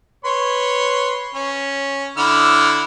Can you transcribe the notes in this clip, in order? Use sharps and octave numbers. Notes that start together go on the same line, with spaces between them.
B4 C#5 C6
C#4
D3 E4 F6